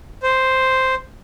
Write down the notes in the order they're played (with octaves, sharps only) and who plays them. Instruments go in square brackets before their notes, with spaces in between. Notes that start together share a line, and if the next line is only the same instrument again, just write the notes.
[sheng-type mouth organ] C5